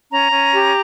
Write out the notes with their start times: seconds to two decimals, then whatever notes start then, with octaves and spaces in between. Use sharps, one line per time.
0.11 C#4 A#5
0.31 C#4
0.52 G4